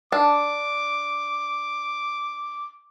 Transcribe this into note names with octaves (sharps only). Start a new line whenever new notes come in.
D4 D6